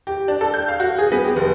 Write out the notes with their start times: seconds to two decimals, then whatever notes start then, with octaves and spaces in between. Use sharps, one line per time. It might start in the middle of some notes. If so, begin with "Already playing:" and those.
0.07 G4
0.28 D4
0.41 A4
0.54 G6
0.68 F5
0.80 F#4
0.98 G#4
1.12 B3
1.25 G4
1.36 F1